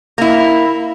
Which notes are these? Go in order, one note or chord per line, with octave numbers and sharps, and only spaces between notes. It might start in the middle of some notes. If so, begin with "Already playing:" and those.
A#3 E4